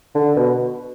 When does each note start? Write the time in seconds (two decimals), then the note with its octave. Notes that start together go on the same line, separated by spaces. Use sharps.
0.15 D3
0.36 B2